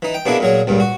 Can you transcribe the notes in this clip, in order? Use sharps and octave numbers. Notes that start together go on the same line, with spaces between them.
E3 D#4
G5
B2 A#3 D4 E4 G#4
A#2 F#3 G#4
C#2 G2 A#2
F#4